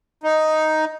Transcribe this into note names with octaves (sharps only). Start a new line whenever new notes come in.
D#4